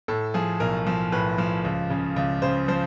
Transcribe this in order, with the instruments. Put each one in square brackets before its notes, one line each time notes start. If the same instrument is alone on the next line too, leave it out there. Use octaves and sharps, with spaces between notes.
[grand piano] A2 A4
F3 G#4
B1 A#4
F3
A2 B4
F3
C#2
C#3
C#2
C#3 C5
F3 C5